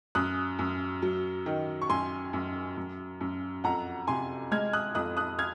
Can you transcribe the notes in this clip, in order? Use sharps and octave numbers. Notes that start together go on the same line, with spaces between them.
F#2 D#6 F#6
F#2
F#3
D#3
C#6
F#2 G#5 C6
F#2
F#2
F#2
F2 F#5 A#5
C3 G#5 C6
G#3 F6 G#6
D#6 F#6
F2 D#6 F#6
D#6 F#6
F6 G#6